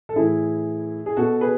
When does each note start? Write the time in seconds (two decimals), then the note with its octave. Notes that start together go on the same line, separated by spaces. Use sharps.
0.09 A4
0.16 A2 E3 E4 G#4
1.06 G#4
1.16 B2 F#4 A4
1.41 G#4 B4